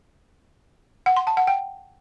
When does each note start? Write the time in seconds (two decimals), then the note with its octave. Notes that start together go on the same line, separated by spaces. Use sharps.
1.06 F#5
1.17 C6
1.27 A5
1.37 F#5
1.47 G5